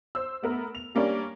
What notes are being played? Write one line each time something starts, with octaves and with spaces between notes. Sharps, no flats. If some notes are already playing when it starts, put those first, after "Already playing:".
C5 E6
A3 B3 A#4
F7
G3 A#3 C#4 D4